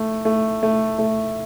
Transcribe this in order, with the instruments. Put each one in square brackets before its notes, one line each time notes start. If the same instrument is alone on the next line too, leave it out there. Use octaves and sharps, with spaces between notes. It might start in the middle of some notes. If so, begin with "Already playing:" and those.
Already playing: [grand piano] A3
A3
A3
A3